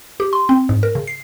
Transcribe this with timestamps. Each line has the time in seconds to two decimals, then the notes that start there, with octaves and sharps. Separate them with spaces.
0.20 G4
0.33 C6
0.49 C4
0.69 G#2
0.83 A#4
0.95 C#3
1.07 C7